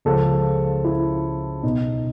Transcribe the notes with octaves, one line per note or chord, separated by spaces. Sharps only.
C#2 C#3 F3 A4
E4
B1 B2 D#4